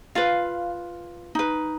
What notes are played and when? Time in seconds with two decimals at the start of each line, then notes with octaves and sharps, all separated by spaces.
0.15 F4 B4 F5
1.35 D#4 B4